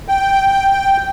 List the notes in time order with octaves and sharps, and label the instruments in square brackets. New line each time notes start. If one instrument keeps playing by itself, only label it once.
[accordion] G5